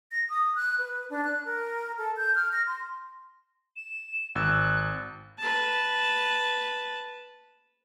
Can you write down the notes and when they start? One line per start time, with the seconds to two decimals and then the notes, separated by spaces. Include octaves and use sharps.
0.12 A#6
0.29 D#6
0.55 F#6
0.78 B4
1.10 D4
1.25 F#6
1.45 A#4
1.98 A4
2.17 G6
2.35 F6
2.52 A#6
2.67 C6
3.76 E7
4.35 G#1 E6 F#6
5.39 B4 A5